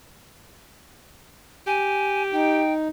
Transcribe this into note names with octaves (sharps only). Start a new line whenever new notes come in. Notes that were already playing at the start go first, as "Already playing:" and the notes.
G4 G#5
D#4 G5